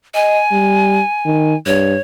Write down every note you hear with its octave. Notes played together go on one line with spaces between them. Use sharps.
D#5 G#5
G3
D#3
G2 C#5